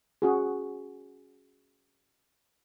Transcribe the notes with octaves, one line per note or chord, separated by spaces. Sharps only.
C#4 F#4 G#4